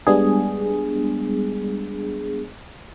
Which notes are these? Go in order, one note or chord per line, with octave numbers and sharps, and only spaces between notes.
G3 G#3 B3 D4 G#4